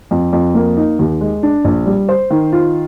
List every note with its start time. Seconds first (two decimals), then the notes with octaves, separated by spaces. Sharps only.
0.11 F2
0.33 F2
0.55 A#3
0.77 D#4
0.99 D#2
1.21 G#3
1.43 D4
1.65 A#1
1.86 G3
2.09 C5
2.30 D#3
2.52 F4